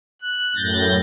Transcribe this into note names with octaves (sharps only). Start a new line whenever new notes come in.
F#6
F#2 A2 G6 A6 A#6